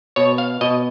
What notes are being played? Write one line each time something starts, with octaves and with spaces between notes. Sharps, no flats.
B2 C#5
F5
B2 D#5